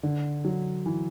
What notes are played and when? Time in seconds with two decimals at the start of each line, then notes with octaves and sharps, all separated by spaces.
0.03 D3
0.45 F#3
0.86 E3